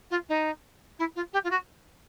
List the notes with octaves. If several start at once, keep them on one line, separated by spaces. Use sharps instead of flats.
F4
D#4
E4
F4
G4
F4
F#4